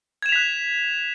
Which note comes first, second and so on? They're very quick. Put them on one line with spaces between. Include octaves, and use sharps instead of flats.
G#6 E7 F7 B6 F#6